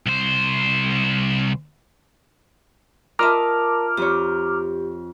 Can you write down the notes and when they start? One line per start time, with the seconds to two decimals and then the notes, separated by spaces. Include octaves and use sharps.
0.06 C2 C5
3.19 F4 A#4 D#5 E5 A5 A#5 D6 F6
3.97 F2 G4 C#5